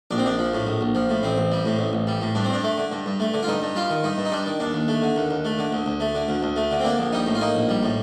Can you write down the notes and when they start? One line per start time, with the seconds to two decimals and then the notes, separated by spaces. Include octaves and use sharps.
0.11 A#1 D4
0.18 C4
0.25 A#1 D4
0.39 F3
0.54 A2
0.67 A#1
0.81 A#1
0.95 F3
1.09 A2
1.23 A1 C4
1.38 A1
1.52 G3
1.65 A2
1.79 A1
1.93 A1
2.07 G3
2.22 A2
2.35 G2 D4
2.44 C4
2.49 G2 D4
2.64 A3
2.78 D3
2.92 G2
3.06 G2
3.20 A3
3.34 D3
3.43 F4
3.48 G2 D#4
3.62 G2
3.75 G3 F4
3.90 D#3
4.04 G2 D#4
4.18 G2
4.25 D#4
4.32 G3 D4
4.46 D#3
4.60 D#2 D4
4.74 D#2
4.88 A3
5.02 D3
5.16 D#2
5.31 D#2
5.45 A3
5.58 D3
5.73 D2
5.86 D2
6.00 A3
6.15 D3
6.29 D2
6.43 D2
6.56 A3
6.71 D3
6.80 C4
6.85 A#3 D4
6.99 A#1
7.13 G3 D#4
7.26 A2
7.35 F4
7.41 A#3 D#4
7.55 A#1
7.69 G3
7.83 A2